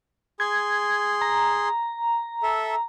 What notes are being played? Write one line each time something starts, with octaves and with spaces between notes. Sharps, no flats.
G#4 C6 G#6
A#5
A4 E5